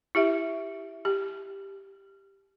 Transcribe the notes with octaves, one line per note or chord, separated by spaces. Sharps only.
E4 G4 E5
G4